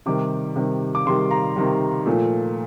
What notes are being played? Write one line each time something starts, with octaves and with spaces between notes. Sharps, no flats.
C3 D#3 G3 D6
C3 D#3 G3
D6
C3 D#3 G3 C6
A#5
C3 D#3 G3
A#2 F3 A3